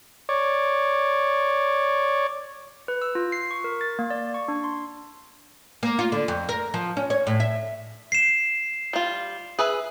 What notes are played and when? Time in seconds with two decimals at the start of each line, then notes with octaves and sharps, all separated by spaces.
0.29 C#5 D5
2.88 B4
3.02 E6
3.15 F4
3.32 C7
3.51 C#6
3.64 A#4
3.81 A6
3.99 A#3
4.10 D5
4.34 C#6
4.48 D4
4.64 C6
5.83 A#3
5.99 F4
6.12 D3
6.28 F2
6.49 A#4
6.74 F3
6.97 C#4
7.10 C#5
7.27 A2
7.40 E5
8.12 C7 E7
8.93 G3 F4
9.59 G#4 B4 E5